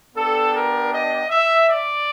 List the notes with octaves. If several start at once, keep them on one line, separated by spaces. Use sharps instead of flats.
B3 D4 G4 A4
A#4
D#5
E5
D5